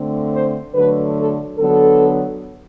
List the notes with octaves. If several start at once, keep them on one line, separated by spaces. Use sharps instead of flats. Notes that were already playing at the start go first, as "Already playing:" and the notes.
Already playing: D3 A3 C4
C5
D3 F#3 A3 B4
A4
D3 F#3 B3 A4